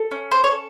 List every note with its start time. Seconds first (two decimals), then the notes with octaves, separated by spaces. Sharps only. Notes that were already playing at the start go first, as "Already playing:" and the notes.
Already playing: A4
0.11 C#4
0.31 C5
0.44 C#5
0.51 A4